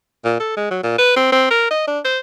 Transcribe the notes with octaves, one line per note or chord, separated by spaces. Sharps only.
A#2
A4
G#3
F#3
A#2
B4
C4
C4
A#4
D#5
D4
C5